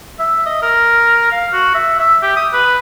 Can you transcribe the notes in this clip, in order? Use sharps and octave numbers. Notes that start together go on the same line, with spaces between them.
E5
D#5
A#4
F5
F#4
E5
E5
G4
D#6
B4